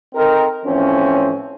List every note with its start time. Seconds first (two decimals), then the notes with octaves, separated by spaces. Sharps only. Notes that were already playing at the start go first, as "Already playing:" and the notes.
0.15 C4 D#4 A4 A#4
0.66 A2 E3 F3 C4 C#4